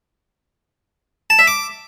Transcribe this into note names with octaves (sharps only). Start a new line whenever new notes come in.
A5
E5
D6